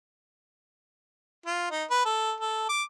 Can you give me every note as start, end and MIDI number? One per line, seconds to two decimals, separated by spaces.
1.46 1.71 65
1.71 1.84 63
1.90 2.01 71
2.05 2.33 69
2.40 2.65 69
2.69 2.83 86